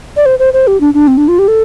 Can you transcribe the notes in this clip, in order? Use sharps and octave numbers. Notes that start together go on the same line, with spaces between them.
D5
C5
C5
C5
G4
D4
D4
C4
D4
F4
G4
A4